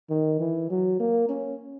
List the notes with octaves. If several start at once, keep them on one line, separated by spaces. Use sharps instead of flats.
D#3
E3
F#3
A#3
C#4